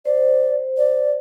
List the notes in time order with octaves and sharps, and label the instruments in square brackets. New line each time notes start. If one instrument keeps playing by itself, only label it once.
[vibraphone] C5 [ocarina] D5
[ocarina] D5